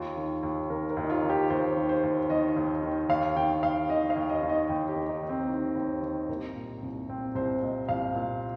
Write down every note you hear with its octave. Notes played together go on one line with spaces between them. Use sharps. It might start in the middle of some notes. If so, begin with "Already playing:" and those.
Already playing: D#2 F4
D#3
D#2
D#3 A#4
A#4
D#2
D#4
F4
D#3
G4
D#2 C5
D#3
C5
D#2
D#3 D#5
D#2
D#3
D#2 F5
D#3 G5
D#2 F5
D#3 D#5
F5
D#2
D#5
D#3
D#5
D#2 G5
G4
D#3
D#4
D#2
C4
D#3
D#2
D#3
C2 A#3
A#2
C2
A#2 C4
C2 C5
A#2 D#5
C2 F5
A#2